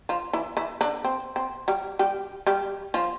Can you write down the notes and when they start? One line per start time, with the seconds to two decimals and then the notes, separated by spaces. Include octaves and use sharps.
0.09 F3 F4
0.33 E3 E4
0.57 E3 E4
0.81 D3 D4
1.04 C4
1.36 C4
1.68 G3 G4
1.99 G3 G4
2.47 G3 G4
2.94 F3 F4